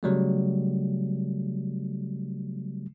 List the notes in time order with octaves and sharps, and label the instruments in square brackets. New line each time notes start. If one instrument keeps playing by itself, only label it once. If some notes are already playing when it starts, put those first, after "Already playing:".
[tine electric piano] C#3 F#3 G3 A3